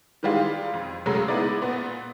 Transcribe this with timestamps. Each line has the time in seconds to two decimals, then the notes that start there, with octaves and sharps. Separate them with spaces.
0.23 D#3 E3 G3 G#3 F4
0.74 F2
1.06 C#3 F#3 G#3 A3
1.28 G#3 B3 D#4 E4 D5
1.62 A#2 B3